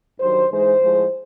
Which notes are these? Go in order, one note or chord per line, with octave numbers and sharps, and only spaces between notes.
G2 D#3 F#3 C5
G#2 E3 G#3 C5
A2 F3 G#3